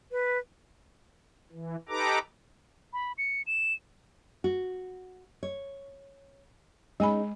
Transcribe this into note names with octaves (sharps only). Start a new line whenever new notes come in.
B4
E3
D#4 G4 A4 B4 A#5 D6
B5
C#7
E7
F#4
C#5
G#3 C#4 D#4 G#4 G#5 B5